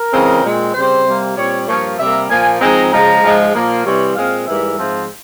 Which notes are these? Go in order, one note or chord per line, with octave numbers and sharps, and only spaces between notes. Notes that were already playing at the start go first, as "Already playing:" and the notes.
Already playing: A#4
C#3 E3 G#3 C4
A#2 G#3 C4
C#3 G3 C4 C5
C3 G3 A#3
A#2 G3 C4 C#5
G2 F3 A#3 C#5
C3 G3 A#3 E5
A#2 F3 A#3 G#5
G#2 F3 G#3 C4 A#5
C#3 F3 G#3 A#5
G#2 F3 G#3
A#2 F3 A#3
C3 E3 G3 C4 C#5
A#2 G#3 C4 F5
G#2 E3 G3 A#3 E5
G#2 F3 C4